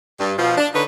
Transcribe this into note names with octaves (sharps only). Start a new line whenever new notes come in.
G2
B2 F3
D4
D3 D#4 B4 C#5